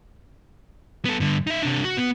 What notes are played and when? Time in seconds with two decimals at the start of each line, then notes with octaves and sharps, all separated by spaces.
1.05 B3 A4
1.20 G2 D3
1.47 D#4 E5
1.63 C3 D4
1.84 F#4
1.97 B3